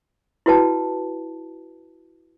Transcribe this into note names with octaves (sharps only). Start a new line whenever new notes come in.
E4 F#4 B4 G5 A5